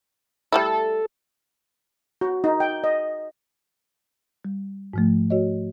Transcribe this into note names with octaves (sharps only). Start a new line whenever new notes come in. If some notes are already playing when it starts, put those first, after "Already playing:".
G3 A3 E4 A4
F#4
D#4
G5
D#5
G3
G#2 F3 A3
F#4 C#5 D#5